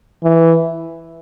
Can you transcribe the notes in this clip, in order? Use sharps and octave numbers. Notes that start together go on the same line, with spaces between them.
E3